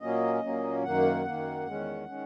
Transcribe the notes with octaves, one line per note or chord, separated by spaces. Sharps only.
A#2 F#3 A#3 C#4 D#5
A#2 F#3 A#3 C#4
F#2 D#3 A#3 F#5
F#2 D#3 A#3
E2 D#3 G#3 C#4
D#3 G#3 C#4